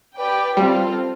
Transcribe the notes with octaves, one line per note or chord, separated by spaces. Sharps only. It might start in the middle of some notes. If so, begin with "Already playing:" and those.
G4 B4 D5 G5
G3 C4 F4 A4